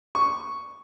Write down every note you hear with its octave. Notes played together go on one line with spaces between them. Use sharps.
C#6